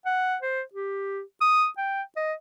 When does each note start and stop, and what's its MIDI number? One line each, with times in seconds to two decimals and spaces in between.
0.06 0.37 78
0.42 0.61 72
0.73 1.21 67
1.41 1.67 87
1.77 2.02 79
2.16 2.33 75